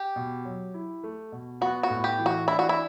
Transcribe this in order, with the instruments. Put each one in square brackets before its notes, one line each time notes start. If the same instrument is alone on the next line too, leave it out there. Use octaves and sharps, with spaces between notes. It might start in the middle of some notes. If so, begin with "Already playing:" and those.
Already playing: [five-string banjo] G4
[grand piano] B2
F#3
E4
A3
B2
[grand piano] B3 [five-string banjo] F#4
[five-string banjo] F#4
[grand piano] A2
[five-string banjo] G4
[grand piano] E3
[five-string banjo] F#4
[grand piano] D4 [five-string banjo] E4
[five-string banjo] F#4
E4